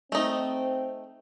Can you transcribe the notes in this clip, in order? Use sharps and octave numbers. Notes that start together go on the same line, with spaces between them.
A3 C4 D#4